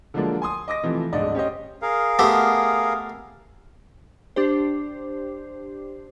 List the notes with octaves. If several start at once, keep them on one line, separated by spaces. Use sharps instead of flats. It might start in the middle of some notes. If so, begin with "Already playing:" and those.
D3 F3 F#3 G#3 A#3 D4
G#5 C6 D#6
D#5 D6 D#6 A#6
C3 E3 F3 A3 C4
D1 G#2 D3 D5 D#5
C#4 G4 C5 D#5
G#4 A#4 F5
A3 B3 G4
D4 G4 C5